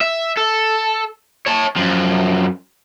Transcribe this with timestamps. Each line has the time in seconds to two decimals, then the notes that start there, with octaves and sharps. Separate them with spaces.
0.01 E5
0.37 A4
1.46 C#5 A5
1.76 F#2 F3